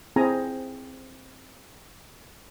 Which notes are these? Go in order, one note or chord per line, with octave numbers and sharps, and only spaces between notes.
C4 E4 G#4 G#5 A#5